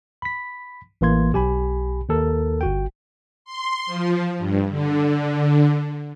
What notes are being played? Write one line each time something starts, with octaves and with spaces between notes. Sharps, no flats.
B5 B6
A1 E3 A#3 C6 G#6
B1 G4 G#5 B5
D#2 A4 A#4
G1 F#4 G5
C6
F3
G2
D3